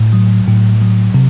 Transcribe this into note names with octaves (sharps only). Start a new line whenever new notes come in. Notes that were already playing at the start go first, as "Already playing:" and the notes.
Already playing: A2
F#3
A2
F#3
C3